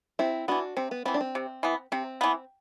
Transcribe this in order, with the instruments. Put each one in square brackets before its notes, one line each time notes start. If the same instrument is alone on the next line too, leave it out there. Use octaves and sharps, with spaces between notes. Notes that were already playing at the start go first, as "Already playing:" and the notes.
[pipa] C3 [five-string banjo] C4 E4
[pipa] E3 B3 [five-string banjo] D4 F#4
[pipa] C3 [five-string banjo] C4
[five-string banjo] B3
[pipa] E3 B3 [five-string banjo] C4
[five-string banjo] D4
C4
[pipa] C3
E3 B3
[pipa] C3 [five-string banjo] C4
[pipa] E3 B3